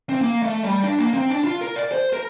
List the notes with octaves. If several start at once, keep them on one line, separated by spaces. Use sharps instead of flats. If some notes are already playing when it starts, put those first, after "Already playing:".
C4
A#3
A3
G3
D4
A#3
C4
D4
F4
A#4
D5
C5
A#4